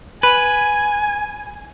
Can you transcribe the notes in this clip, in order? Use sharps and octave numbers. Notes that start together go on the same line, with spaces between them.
B4 G#5